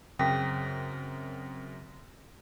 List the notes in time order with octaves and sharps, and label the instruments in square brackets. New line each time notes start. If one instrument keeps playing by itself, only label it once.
[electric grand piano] F#2 A#4 B6 [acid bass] C#3 [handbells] C4 D#6 A#6 [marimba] G5